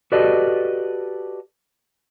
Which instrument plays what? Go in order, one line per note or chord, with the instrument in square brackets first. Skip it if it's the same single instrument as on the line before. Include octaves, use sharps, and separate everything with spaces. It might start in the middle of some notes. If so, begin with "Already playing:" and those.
[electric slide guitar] F#4 G4 A4 B4 D5 D#5